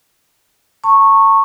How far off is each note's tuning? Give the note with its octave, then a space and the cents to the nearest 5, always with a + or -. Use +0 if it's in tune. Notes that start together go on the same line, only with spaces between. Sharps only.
A5 +40 C#6 -10